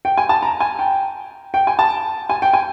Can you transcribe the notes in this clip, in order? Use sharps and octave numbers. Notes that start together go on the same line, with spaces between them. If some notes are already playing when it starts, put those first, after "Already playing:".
G5
G#5
A5
A#5
G#5
G5
G5
G#5
A5
G#5
G5
G#5